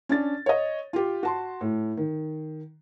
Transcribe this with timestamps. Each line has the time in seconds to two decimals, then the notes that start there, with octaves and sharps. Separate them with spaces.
0.09 C#4 D4 A6
0.46 C#5 D#5
0.93 F4 G4
1.23 F#4 A5 C6
1.61 A2
1.97 D#3